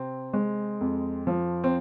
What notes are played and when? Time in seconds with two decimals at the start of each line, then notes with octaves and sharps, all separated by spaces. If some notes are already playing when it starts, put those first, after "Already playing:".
Already playing: C3 C4
0.34 G#3
0.81 F2
1.27 F3
1.64 C4